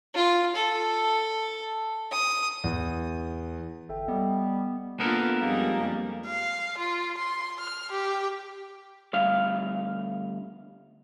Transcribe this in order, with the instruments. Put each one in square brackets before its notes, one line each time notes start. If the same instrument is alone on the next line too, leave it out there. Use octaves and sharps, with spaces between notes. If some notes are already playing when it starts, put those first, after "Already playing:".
[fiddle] F4
A4
D#6
[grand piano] E2
[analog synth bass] G1 [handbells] A4 E5 G5
[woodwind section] G3 [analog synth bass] B3 [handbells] D#5 G5
[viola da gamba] A#3 D4 F4 [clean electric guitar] B3 A4 A#4
[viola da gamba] F2 G3 G#3 [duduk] A#3
[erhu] F5
F4
C6
F6
G4
[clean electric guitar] D2 G2 F5